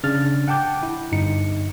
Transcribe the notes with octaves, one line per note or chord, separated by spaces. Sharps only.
C#3 D4 F6 A6
F#5 G5 A5 D6 G6
E4
G1 G2 D#4 C#7